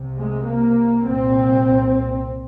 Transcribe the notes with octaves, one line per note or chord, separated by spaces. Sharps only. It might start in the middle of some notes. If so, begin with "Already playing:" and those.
Already playing: C2 C3
G#3
A#3
C2 A#2 C4